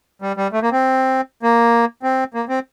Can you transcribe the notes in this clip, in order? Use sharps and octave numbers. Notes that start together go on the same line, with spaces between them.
G3
G3
A3
A#3
C4
A#3
C4
A#3
C4